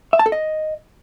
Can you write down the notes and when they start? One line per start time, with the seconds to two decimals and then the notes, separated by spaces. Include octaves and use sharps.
0.13 E5
0.19 A5
0.26 A4
0.32 D#5